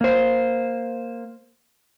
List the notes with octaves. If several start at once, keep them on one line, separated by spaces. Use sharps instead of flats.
A#3 C5